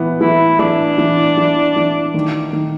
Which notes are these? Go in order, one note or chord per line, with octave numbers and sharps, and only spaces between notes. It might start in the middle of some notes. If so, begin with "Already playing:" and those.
Already playing: E3 B3
E3 E4
E3 D4
E3
E3
E3
D#3
D#3